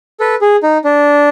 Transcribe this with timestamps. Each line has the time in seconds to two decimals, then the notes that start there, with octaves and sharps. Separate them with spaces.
0.20 A4 B4
0.41 G#4
0.63 D#4
0.84 D4